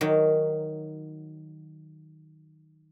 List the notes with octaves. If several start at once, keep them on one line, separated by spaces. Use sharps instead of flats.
D#3 F#3